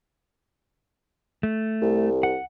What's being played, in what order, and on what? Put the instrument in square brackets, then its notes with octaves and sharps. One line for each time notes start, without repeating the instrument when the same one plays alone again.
[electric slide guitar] A3
[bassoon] C2
[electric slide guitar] F#5